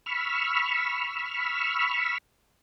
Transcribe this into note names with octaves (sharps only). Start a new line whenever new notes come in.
B5 C#6 E6 F6